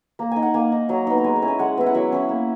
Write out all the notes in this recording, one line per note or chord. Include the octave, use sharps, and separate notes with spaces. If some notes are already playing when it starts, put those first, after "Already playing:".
A#3 A#5
D#4 G#5
F#5
A#3 G#5
D#4
F#3 A#5
B3 D#4
A#5
G#3 G#5
A#5
C#4 E4
G#5
G#3 F#5
B3 E4
F#5
F#3 E5
C#4 E4
A#3